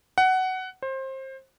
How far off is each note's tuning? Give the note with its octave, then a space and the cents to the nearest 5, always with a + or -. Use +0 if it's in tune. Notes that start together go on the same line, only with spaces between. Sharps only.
F#5 +15
C5 +25